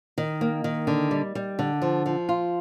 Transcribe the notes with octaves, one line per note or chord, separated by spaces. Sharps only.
D#3
A#3
D#3
D3
G3
G3
D3
F3
F3
F4